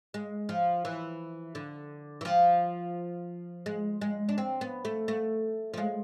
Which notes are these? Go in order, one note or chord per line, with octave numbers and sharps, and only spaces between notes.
G#3
F3
E3
D3
E3
F3
G#3
G#3
D4
C4
B3
A3
A3
F3
G#3